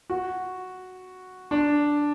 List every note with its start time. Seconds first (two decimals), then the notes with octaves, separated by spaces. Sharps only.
0.10 F#4
1.51 D4